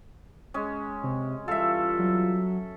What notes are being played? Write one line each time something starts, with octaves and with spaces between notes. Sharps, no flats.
G#3 C#4
C3
E3 G3 F4 A4 E5 F5
F#3